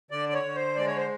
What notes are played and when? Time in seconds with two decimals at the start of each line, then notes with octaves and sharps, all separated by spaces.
0.11 D3 D5
0.29 D5
0.33 C#5
0.43 D3
0.55 C5
0.76 G#3 D5
0.87 C#5
0.97 C5